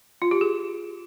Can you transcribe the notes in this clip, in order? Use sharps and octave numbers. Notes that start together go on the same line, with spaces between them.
F4
G4
G#4